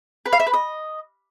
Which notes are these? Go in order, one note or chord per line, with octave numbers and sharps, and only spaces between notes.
B4
F5
E5
B4
D#5